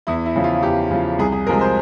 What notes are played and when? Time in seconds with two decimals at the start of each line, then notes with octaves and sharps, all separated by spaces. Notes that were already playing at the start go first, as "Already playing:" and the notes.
0.07 E2 E4
0.26 E4
0.35 C#3 F3
0.44 F4
0.63 E2 G4
0.91 C#3 F3
1.18 C2 G#4
1.32 G#4
1.47 C3 F3 G#3 A#4
1.61 C5